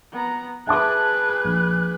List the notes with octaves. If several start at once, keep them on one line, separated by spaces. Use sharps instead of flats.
B3 A#5
G#4 B4 E5 A5 D6 F#6
A#1